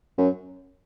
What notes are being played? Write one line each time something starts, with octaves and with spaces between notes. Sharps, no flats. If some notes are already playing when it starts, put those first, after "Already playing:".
F#2